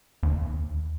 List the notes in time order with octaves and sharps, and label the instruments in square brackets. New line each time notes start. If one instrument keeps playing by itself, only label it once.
[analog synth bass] D#2